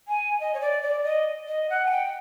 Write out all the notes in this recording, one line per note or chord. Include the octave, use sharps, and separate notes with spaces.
G#5
D#5
C#5
D5
D5
D#5
D#5
F#5
G#5
G5